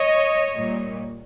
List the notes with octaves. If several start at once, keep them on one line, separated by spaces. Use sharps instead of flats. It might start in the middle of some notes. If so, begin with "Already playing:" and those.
Already playing: C#5 D#5
A#2 G3 A#3